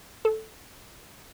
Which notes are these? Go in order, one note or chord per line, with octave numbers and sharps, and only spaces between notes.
A4